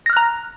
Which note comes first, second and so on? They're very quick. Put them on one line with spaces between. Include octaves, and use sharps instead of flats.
A#6 F6 F#6 A#5